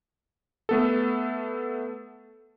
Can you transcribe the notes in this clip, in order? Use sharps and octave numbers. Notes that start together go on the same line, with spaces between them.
A3 B3 A4